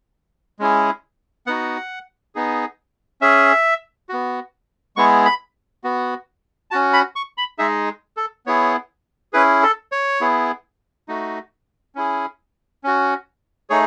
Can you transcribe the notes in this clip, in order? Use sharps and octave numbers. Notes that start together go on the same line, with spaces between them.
G#3 C#4 E4 G#4
B3 D#4 F#4 F#5
B3 D#4 G#4
C#4 G#4 E5
B3 F#4
G#3 B3 E4 G#4 C#6
B5
B3 F#4
C#4 F#4 A5
B5
C#6
B5
G#3 D#4 G#4 E5
A4
B3 E4 G#4 C#5
C#4 E4 G#4 B4
A4
C#5
B3 E4 G#4
A3 D#4 F#4
C#4 E4 G#4
C#4 F#4
A3 D#4 G#4 C#5